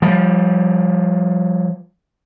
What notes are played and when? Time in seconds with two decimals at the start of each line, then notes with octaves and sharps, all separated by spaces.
0.02 F3 G3